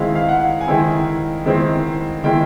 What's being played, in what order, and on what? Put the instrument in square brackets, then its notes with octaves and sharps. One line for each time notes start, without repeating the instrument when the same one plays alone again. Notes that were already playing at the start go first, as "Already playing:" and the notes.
Already playing: [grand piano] D#3 G#3 C4 E4 F5
F5
F#5
G#5
D#3 G#3 C4 E4 G5
D#3 G#3 C4 E4
D#3 G#3 C4 E4 G5